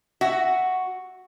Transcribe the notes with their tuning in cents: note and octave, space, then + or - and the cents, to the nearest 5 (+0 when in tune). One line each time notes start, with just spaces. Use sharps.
F#4 +0 E5 +0